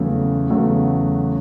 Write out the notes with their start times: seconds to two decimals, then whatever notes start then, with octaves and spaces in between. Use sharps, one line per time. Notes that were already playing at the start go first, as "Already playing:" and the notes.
Already playing: E2 C#3 F#3 A3
0.50 E2 C#3 F#3 A3